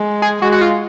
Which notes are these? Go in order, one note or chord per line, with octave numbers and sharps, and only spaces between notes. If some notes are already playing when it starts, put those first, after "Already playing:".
Already playing: G#3
G#4
G#3 F#4
F#4
F4